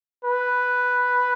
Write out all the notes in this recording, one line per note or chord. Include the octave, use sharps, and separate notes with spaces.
B4